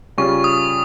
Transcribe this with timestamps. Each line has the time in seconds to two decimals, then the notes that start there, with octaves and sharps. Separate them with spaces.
0.18 C#3 G3 C#4 F4 C#6
0.44 D#6